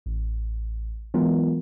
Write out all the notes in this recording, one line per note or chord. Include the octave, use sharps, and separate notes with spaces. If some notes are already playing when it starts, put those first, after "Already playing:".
A1
E3 F#3 G#3 B3 F4 A#4